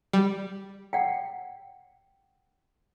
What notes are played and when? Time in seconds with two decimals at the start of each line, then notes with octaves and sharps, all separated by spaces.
0.13 G3
0.93 F#5 G5